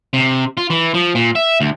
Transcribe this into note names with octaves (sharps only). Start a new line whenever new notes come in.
C3
F4
E3
F3
A#2
E5
D2